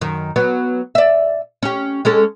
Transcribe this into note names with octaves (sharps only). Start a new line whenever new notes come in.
F#2 D#3
F#3 B3
D5 E5
C#4 G4
G#3 C#4 A4